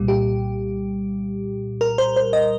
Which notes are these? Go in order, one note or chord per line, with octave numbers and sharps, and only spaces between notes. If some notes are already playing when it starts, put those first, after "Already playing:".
Already playing: C2 A#2 G3
G4
A#4
C5
C5
D#5